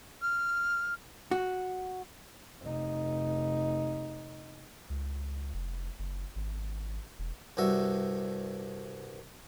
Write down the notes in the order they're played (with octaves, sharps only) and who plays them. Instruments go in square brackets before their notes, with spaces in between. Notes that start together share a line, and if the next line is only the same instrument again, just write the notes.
[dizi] F6
[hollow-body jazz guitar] F#4
[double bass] F1 D#4
[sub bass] C#2
F1
F#1
G#1
E1
[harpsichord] C2 G2 F#4 E5